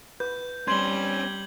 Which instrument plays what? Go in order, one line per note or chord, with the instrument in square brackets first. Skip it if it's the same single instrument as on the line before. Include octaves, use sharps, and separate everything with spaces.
[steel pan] B4 [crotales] G6
[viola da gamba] G3 [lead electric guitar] C4 C#4 [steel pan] C6 [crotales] G#6 F#7 G7